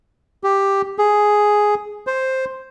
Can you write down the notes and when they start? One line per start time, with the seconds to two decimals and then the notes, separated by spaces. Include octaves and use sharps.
0.44 G4
0.98 G#4
2.07 C5